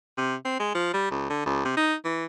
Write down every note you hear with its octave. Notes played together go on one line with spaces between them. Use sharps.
C3
C4
G#3
F3
G3
C#2
D3
C#2
C3
D#4
E3